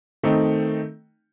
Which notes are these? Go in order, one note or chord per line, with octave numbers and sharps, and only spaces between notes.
D#3 A3 C4 D#4